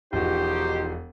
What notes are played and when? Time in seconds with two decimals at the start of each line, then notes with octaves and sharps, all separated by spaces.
0.13 E1 F3 D#4 F#4 G4 C5